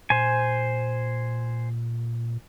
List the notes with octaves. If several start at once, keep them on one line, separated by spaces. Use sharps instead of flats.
A#2 C5 G#5